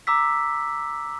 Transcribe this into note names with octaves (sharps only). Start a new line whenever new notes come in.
A#5 D6 E6 B6